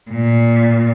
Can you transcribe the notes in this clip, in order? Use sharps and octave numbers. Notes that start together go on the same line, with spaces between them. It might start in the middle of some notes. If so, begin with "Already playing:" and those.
A#2